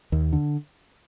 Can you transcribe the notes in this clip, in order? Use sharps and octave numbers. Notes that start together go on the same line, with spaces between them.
D#2
D3